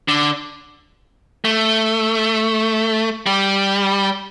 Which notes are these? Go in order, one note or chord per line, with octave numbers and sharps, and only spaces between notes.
D3
A3
G3